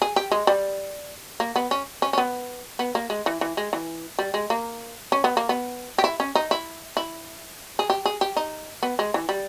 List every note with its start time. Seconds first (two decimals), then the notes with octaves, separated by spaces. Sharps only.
0.02 G#4
0.16 G4
0.32 G#3
0.47 G3
1.40 A#3
1.56 B3
1.71 C#4
2.02 C#4
2.13 C#4
2.18 B3
2.79 B3
2.95 A#3
3.10 G#3
3.26 E3
3.41 E3
3.57 G#3
3.73 E3
4.19 G3
4.34 G#3
4.50 A#3
5.12 C#4
5.24 B3
5.37 A#3
5.49 B3
5.98 G4
6.04 E4
6.20 C#4
6.35 D#4
6.51 E4
6.97 E4
7.79 G#4
7.90 G4
8.06 G#4
8.21 G4
8.37 D#4
8.83 B3
8.99 G#3
9.14 E3
9.29 G3